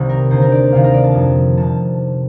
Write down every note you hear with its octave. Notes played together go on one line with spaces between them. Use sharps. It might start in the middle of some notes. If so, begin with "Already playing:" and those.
Already playing: C2 C3 D#3
A#4
D#2 D3 C5
A#4
D5
D2 C3 D#3 F5
A#4
D5
A5
F2 D#3
C3 D#3 A5